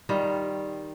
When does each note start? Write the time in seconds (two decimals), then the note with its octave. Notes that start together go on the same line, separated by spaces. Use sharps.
0.09 D#3 G3 F4